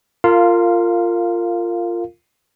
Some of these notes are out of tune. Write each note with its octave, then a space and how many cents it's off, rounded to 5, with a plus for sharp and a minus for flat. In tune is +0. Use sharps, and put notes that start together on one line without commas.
F4 -10 A#4 -30 F5 +0